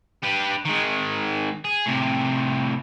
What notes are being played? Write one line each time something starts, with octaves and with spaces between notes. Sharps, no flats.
G3 B4
D#3 G#3
G#4
A2 C3